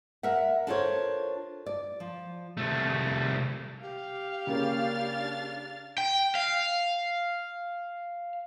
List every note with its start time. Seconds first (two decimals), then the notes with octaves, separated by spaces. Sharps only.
0.23 A#4 E5 F#5
0.67 D4 F4 A4 A#4 C5 C#5
1.66 D5
2.00 F3
2.57 C2 A3
3.82 G4 F5
4.47 C#3 A#3 C#4 D4 F6 A6
5.98 G5
6.35 F5